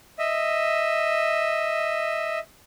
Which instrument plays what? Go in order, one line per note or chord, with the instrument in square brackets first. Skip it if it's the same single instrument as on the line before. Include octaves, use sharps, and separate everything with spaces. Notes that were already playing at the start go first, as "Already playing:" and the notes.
[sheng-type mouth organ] D#5 E5